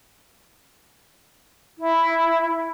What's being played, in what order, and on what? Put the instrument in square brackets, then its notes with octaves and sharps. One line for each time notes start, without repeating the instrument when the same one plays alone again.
[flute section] E4